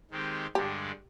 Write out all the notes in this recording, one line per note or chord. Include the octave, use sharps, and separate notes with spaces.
D#3 G#3 C4 G4
G2 D3 G#3 D4 G4